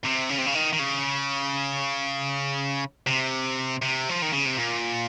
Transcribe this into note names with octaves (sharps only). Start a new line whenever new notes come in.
C3
C#3
C3
C#3
D#3
D#3
C#3
C3
C3
F3
D#3
C#3
C3
A#2